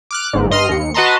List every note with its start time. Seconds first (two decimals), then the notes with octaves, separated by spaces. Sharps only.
0.11 D6 F6 F#6
0.33 G1 G#2
0.51 G2 D#5 C6 F6 C7
0.69 D#2 C#7
0.94 F#4 B4 D#5 A5 A#5 C6